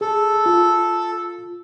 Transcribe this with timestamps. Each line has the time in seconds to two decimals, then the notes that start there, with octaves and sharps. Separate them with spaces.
0.01 G#4 A4
0.46 F4